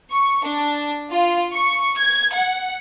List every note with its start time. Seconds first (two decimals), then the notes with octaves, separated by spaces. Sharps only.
0.11 C#6
0.44 D4
1.11 F4
1.52 C#6
1.97 G#6
2.34 F#5